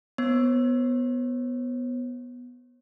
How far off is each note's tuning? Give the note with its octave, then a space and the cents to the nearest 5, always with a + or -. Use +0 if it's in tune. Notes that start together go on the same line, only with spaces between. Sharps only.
B3 +0 C#5 -45